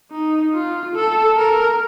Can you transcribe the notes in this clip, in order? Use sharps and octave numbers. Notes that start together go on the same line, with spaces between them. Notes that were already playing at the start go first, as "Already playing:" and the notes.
D#4
F4
A4
A#4